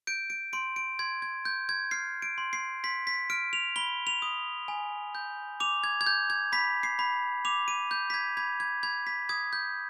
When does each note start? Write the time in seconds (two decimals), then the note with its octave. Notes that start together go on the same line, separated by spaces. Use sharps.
0.07 G6 D7
0.30 D7
0.53 C6 D7
0.76 D7
0.99 C6 G#6
1.22 G#6
1.45 G6
1.69 G#6
1.91 F6 C7
2.22 D7
2.38 C6
2.53 C7
2.84 C6 B6
3.07 B6
3.30 F6 D7
3.53 F7
3.76 B5 G7
4.07 F7
4.22 D#6
4.68 G#5
5.15 G6
5.60 D6 F7
5.84 G#6
6.01 G#6
6.07 G6
6.30 G#6
6.52 B5 B6
6.83 C7
6.99 B5
7.45 D6 F7
7.68 D#7
7.91 G6
8.10 B6
8.14 G#6
8.37 B5 G#6
8.60 G#6
8.83 B5 G#6
9.07 B6
9.29 D#6 G#6
9.53 G6